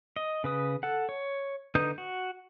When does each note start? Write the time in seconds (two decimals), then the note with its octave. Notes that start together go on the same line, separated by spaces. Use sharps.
0.16 D#5
0.44 C#3 B4 D#6
0.83 A4 F#5
1.09 C#5
1.75 D3 D#4 B4 D#6 G6
1.98 F#4